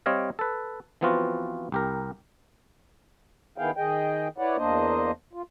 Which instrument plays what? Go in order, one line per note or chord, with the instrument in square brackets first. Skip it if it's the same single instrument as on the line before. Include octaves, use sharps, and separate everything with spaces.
[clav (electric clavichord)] G3 C4 C#5 D#5 F5
A4 B4
E3 F3 B3 C4 F4 F#4
C2 G4 A#4
[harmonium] D#3 B3 E4 G#4 F5 G5
D#3 G#4 D#5 G5
E4 B4 C#5 D5 F#5
E2 A#3 D4 C5 D#5
F4